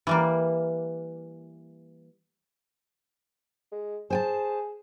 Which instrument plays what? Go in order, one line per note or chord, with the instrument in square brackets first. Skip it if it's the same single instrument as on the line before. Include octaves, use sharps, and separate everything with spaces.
[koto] E3 G3 A#3
[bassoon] G#3
[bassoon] G#4 [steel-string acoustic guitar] C5 G#5 A5